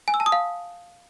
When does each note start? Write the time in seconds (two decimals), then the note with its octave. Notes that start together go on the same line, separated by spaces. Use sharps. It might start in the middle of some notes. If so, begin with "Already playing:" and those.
0.08 G#5
0.14 E6
0.20 A5
0.26 D#6
0.32 F5